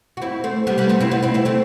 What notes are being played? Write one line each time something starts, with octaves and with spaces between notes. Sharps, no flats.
F#4
C4 E4
A3 C4
G3 B3
G3 B3
A3 C4
C4 E4
B3 D#4
C4 E4
C4 E4
A3 C4